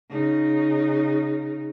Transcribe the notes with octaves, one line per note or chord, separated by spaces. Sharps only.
C#3 D#4